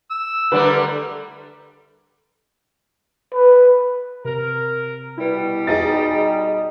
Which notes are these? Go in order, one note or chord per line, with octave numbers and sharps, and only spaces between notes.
E6
D3 G3 A3 A#4 B4 D5
B4
C3 A#4
B2 G3 E4 B4
D#4 G#4 D#5 D#6 A6